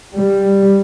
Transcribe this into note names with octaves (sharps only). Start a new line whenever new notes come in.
G3